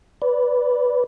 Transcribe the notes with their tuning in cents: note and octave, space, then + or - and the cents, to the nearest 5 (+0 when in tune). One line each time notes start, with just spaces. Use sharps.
B4 +0 D5 -20